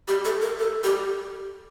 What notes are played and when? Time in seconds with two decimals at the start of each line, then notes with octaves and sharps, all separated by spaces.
0.08 G4
0.25 A4
0.42 A#4
0.60 A4
0.84 G4